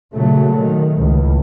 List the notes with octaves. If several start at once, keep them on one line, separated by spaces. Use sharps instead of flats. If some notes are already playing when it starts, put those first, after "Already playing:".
A#2 C#3 F#3 A3
D#3
C#2 A2